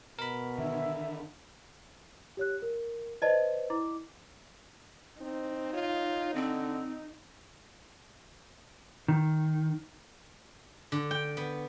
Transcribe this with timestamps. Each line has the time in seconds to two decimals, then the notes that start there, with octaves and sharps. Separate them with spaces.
0.19 B2 A#4 B5
0.58 D3 D#3 E5
2.37 G4 C#5 F#6
2.62 A#4
3.22 B4 C5 D5 D#5 A5
3.70 E4 D6
5.21 C4 D#4
5.73 F4 C#5
6.34 D3 C4
9.08 D#3
10.92 D3
11.11 G5
11.37 B3